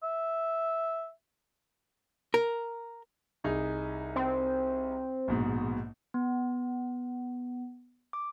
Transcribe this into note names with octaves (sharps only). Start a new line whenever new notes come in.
E5
A#4
C2 D#4 G#4
C4
A#1 G#2 B2
B3
D6